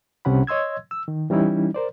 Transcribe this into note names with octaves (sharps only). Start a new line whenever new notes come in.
C2 C3 C#4 F#5 B5
C#5 D#5 C6 E6 G#6
E6
D#3
E3 G3 C#4 D#4 E4
A#4 C5 D5